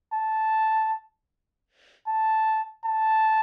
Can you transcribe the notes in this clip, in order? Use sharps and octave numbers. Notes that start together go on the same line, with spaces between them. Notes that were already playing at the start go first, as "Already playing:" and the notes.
A5
A5
A5